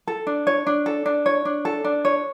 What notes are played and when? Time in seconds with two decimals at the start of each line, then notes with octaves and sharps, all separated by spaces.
0.07 A4
0.27 D4
0.47 C#5
0.67 D4
0.86 A4
1.06 D4
1.26 C#5
1.45 D4
1.65 A4
1.84 D4
2.05 C#5